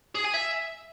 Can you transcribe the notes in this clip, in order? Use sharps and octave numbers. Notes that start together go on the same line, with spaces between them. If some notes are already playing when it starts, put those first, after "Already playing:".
G#4
G#5
E5